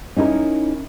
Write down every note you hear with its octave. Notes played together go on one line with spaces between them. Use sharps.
C#4 D#4 E4 A#4